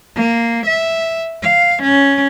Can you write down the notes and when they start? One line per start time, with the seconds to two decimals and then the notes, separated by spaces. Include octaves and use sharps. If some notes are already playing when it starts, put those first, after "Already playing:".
0.16 A#3
0.67 E5
1.43 F5
1.83 C#4